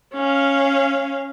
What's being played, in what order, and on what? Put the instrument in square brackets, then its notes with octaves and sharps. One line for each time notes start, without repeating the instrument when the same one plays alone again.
[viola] C#4 F5